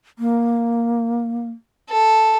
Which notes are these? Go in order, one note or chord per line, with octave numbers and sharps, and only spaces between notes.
A#3
A4